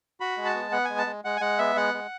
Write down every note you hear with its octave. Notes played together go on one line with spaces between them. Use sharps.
F#4 B5
G#3
A5
B3
B3 F#5
G#3 G#5
A5
G#3
G#3 F#5
G#5
G#3 F#5
B3 E5
G#3 F#5
G#3